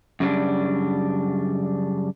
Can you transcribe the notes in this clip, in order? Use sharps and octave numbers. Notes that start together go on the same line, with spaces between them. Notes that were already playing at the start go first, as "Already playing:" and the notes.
F#2 C#3 G3 D4